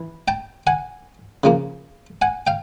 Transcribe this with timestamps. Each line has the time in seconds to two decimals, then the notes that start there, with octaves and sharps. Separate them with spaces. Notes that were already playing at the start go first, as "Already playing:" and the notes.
Already playing: E3
0.28 G5 A5
0.67 F#5 G#5
1.44 C#3 F3 A#3
2.22 F#5 G#5
2.47 F5 G5